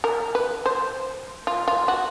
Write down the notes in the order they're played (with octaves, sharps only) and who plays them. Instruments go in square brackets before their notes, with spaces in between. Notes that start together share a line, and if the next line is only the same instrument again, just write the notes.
[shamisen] A#4
B4
C5
F4
F4
F#4